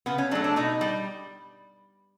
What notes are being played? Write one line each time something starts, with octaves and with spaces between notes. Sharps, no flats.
C#3 B3
C#4
F#3 A3 D4
D4
B2 D#4
G3